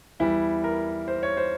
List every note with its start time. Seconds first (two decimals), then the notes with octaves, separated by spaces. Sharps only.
0.20 E2 E3 G3 E4
0.64 A#4
1.08 C5
1.23 C#5
1.37 C5